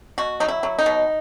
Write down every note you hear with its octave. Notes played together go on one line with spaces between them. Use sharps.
B2 F#4
F#3 D#4
E4
F#3
D#4
B2